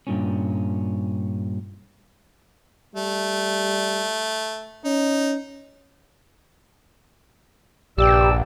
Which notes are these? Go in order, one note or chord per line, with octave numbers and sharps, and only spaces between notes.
G2 A#2 C#4
G3 A3
C#4 D#4
A#1 G2 G4 D5 E6